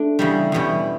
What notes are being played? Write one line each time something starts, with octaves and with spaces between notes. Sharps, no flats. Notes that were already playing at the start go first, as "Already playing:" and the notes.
Already playing: A3 D4
E2 C#3 G3
E2 B2 G3 C#4